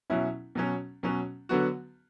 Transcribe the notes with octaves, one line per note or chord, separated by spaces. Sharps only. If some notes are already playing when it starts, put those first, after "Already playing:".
B2 F#3 C#4 E4
B2 F#3 C#4
B2 F#3 C#4
D3 F#3 B3 F#4